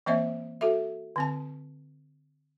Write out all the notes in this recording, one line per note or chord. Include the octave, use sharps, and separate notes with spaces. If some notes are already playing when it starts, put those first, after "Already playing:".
E3 A#3 C4 C5 D#5 E5
F#4 A4 E5
D3 C4 A5